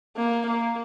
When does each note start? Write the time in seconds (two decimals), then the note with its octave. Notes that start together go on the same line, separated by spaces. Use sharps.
0.17 A#3
0.47 A#3